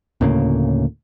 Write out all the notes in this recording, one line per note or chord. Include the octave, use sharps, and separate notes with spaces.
D2 A2 C#3 A#3